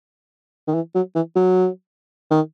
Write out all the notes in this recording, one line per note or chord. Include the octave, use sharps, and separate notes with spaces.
D#3
E3
F#3
E3
F#3
D#3